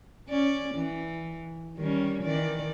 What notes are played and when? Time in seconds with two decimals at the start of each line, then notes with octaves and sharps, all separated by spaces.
0.28 C#4 D5
0.75 E3
1.77 D#3 G3 C#4
2.24 D#3 E3 D5